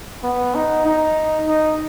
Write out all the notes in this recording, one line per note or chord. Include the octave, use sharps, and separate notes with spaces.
B3
D#4
D#4
D#4